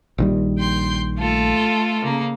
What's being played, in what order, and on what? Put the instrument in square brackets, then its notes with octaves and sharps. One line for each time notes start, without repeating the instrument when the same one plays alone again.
[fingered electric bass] A#1 D#3 G3
[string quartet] G5 C6 G6
A3 F4 A4
C#3 A#3